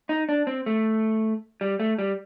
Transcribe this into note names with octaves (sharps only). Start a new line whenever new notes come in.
D#4
D4
C4
A3
G3
A3
G3